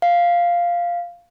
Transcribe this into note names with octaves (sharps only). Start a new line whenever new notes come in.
F5